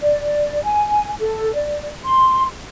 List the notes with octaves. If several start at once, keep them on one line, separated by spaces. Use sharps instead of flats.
D5
G#5
A4
D5
C6